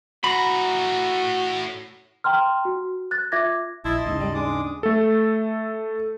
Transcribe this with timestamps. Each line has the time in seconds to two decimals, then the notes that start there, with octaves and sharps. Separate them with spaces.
0.24 A2 F#4 A#5 B5
2.24 G5 A#5 C6 F6
2.65 F#4
3.11 F#6 A6
3.32 F4 E5 D6 G#6 A#6
3.85 A#1 E4 D#5 A5 C6
4.06 D#2 G#2 C#3 D#4
4.19 G3
4.34 G#3 D4 D6 D#6
4.83 A3 A4